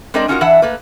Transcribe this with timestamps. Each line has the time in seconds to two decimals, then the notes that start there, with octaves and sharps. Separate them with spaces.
0.14 G#3 C4 D4 A#4 D5 D#5
0.28 C#4 D#4 F4 F#4 A4 A#4
0.41 E3 D4 E4 E5 F#5
0.62 A3 A#3 B4